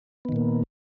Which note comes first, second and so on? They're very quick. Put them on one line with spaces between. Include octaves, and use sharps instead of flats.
B3 D#3 A#2 A#3